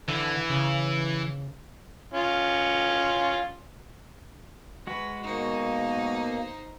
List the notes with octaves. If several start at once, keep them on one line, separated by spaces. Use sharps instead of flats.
D3 E3
C#3
C#4 F4
G#3 F#4 B4
B2 A#3 D#4 C5